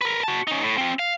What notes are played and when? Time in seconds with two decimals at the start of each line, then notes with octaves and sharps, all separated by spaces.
0.01 A#4 B4
0.24 F#4 A5
0.48 C#4 D#4
0.63 A2
0.78 C4 F4
0.99 F5